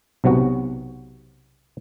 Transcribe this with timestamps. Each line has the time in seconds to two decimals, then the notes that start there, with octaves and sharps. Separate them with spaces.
0.24 B1 C3 F#3 B3 F#4